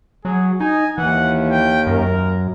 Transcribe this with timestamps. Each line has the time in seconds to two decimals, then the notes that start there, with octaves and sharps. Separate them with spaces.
0.25 F#3 G#4
0.60 D#4 G#5
0.98 D#2 E3 F#5
1.51 G5
1.87 F#2 A#4